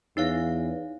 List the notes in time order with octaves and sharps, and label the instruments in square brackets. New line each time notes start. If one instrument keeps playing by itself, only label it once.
[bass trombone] E2 [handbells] D#4 C#5 F5